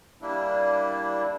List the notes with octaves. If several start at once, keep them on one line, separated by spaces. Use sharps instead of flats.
G3 A#3 D4 E4